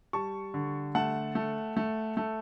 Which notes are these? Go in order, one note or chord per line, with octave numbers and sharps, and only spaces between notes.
G3 A5 C#6
D3
A3 F#5 A5
A3
A3
A3